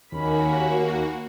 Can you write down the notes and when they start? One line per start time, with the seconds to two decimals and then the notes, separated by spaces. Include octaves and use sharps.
0.12 D#2 A#3 C#4 F#4 B5